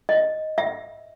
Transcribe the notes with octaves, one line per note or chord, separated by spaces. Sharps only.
D#5
E5